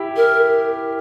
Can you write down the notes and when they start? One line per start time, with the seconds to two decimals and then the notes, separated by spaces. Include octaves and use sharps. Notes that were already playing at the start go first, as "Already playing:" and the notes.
Already playing: E4 G4
0.17 A#4